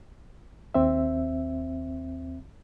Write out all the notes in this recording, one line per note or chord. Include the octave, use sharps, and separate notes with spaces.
D#2 C4 E5